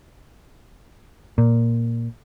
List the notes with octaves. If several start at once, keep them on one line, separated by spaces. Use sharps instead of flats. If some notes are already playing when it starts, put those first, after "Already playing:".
A#2